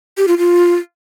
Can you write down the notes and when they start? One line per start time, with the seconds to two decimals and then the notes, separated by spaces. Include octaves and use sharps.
0.17 G4
0.28 F4
0.38 F4